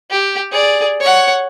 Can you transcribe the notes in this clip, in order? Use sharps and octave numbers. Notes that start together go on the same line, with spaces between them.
G4
G#4 D5
C#5 F#5